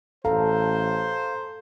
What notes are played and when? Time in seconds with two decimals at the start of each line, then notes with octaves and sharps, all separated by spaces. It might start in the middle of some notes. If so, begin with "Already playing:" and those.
0.25 A1 A4 C5 F5 A#5